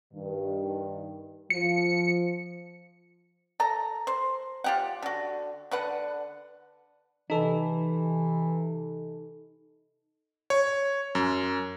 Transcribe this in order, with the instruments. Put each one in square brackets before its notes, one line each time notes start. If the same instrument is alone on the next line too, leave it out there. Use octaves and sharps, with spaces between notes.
[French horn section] G2 D#3
[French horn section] F3 [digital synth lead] C#7
[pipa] A4 A#5
C5
F4 G4 F#5
D3 F#4
D3 B4 F#5
[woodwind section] C3 E3 [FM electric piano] D#4 A4
[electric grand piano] C#5
F#2